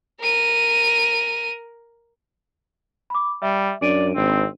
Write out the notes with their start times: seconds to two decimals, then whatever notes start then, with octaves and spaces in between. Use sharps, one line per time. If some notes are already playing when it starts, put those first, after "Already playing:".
0.21 A#4 D#7
3.10 B5 D6
3.42 G3 E5
3.82 F#2 D4 D5 D7 D#7
4.16 G#1 C4